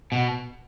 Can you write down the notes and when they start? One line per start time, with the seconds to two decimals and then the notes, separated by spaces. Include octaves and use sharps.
0.12 B2